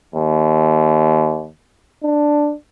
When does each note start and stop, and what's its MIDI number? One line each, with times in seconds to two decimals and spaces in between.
0.15 1.48 39
2.04 2.53 62